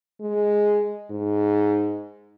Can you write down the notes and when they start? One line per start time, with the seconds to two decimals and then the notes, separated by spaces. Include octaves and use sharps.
0.21 G#3
1.10 G#2